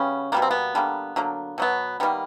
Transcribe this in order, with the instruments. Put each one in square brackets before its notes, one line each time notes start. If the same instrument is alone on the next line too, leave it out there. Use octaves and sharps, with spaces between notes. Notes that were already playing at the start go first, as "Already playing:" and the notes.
Already playing: [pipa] C#3 G3 B3 C#4
B2 G3 A#3 B3
C4
B3
D3 G3 A#3
D3 F#3 A#3
B2 F#3 B3
D#3 G3 A#3 B3